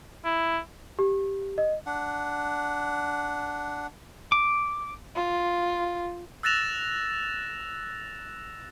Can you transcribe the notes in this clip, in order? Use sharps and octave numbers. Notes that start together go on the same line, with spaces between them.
E4
G4
D#5
D4 F#5
D6
F4
E6 F#6 A6 A#6 E7 F7